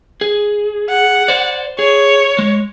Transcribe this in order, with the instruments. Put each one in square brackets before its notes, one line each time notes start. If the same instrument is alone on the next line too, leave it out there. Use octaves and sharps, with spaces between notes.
[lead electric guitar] G#4
[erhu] F#5
[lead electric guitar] C5 D5
[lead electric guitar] G#4 [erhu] C#5
[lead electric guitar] G#3